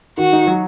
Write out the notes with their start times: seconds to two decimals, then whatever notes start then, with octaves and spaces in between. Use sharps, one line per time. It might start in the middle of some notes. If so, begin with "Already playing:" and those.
0.17 D#3 F#4
0.33 D#4
0.47 F#3